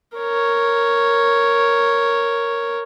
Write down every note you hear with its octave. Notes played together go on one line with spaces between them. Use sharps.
A#4 C#5